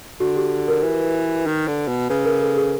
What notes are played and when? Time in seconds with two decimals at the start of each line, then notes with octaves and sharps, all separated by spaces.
0.20 D3 F#4
0.36 G4
0.68 A#4
0.83 E3 B4
1.47 D#3
1.68 D3
1.88 B2
2.10 C#3 B4
2.25 A#4
2.41 A4
2.57 G#4